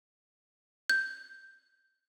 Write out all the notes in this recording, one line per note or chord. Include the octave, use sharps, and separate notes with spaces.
G6